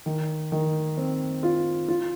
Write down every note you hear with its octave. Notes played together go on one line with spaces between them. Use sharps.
D#3
D#3
C4
F4
F4